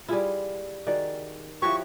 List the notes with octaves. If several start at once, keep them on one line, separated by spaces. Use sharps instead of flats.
G3 E4 F4 G#4 G#5
D#3 F#4 G#4 D5
F3 E4 F#4 G4 C#5 C#6